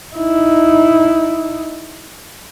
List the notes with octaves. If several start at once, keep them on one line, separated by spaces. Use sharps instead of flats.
D#4 E4